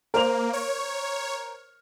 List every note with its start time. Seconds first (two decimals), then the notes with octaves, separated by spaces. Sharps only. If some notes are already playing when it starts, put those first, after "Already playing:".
0.14 A#3 A#4 C5 F7
0.53 C#5